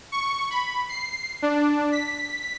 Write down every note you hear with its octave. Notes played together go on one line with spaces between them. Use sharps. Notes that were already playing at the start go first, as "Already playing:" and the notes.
C#6
B5
C7
D4
B6